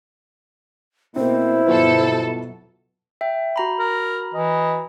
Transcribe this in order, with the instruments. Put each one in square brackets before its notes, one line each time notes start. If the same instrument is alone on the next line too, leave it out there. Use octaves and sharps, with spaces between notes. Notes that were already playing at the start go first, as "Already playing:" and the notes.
[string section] B2 [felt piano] A#3 C4 [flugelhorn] E4 [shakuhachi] C5
[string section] G1 B2 A4 [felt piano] F#3 F4 B4
[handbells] E5 G5
F#4 A#5 B5
[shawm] A#4
[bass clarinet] E3 [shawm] D#5